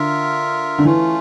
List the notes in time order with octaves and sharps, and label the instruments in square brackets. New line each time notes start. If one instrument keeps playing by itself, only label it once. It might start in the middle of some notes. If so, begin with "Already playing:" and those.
Already playing: [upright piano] D3 [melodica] F4 A#4 E5
[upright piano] D3
[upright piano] E3 [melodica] A3 C#4 F4